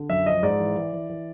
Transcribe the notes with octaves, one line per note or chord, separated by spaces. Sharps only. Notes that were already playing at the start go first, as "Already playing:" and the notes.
Already playing: D3
F#2 E5
F3 D#5
G#2 D5
E3
E3
E3
E3